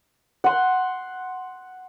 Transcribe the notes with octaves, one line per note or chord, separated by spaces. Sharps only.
F#5 C6